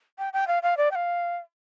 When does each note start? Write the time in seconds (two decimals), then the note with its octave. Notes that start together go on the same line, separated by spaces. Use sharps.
0.19 G5
0.33 G5
0.48 F5
0.63 F5
0.77 D5
0.91 G5
0.95 F5